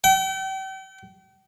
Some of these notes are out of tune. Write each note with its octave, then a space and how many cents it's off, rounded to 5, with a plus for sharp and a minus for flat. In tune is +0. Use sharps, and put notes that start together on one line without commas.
G5 -40